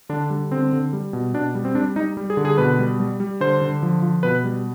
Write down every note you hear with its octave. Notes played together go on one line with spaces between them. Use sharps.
D3 D4
G3
D3 C4
D3
G3
B2
B2 D4
G3
C4
G3 D4
G3 D#4
G3
G#4
D3
G#4
B2 B4
G3
G3
G3
D3 C5
D3
F3
F3
B2 B4
G3